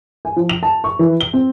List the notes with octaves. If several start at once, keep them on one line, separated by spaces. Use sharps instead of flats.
G#5
F3
F7
A5
C#6
E3
G7
C4